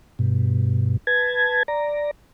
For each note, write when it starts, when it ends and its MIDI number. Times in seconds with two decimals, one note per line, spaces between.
0.19 0.97 43
0.19 0.97 47
1.07 1.63 71
1.07 1.63 81
1.07 1.63 92
1.68 2.11 74
1.68 2.11 82